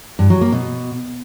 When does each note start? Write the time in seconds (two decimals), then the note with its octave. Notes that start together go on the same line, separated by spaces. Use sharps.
0.19 G2
0.30 F#3
0.41 A#3
0.52 B2